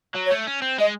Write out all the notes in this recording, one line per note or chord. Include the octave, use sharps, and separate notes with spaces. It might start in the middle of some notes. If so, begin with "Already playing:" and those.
F#3
C#5
A3
C#4
C4
G#3 D#5